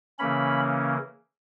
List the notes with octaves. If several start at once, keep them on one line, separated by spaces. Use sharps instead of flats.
C#3 E3 A#3 C#4 B5